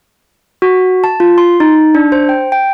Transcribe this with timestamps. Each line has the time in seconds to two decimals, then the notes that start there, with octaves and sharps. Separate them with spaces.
0.62 F#4
1.04 A5
1.20 F4
1.38 C6
1.60 D#4
1.95 D4
2.12 C5
2.29 G5
2.52 G5